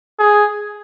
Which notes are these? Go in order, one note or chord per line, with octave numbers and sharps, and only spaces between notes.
G#4